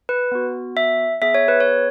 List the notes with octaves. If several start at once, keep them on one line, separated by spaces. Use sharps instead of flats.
B4
B3 F#4
E5
B3 G#4 E5
C#5
B4
C#5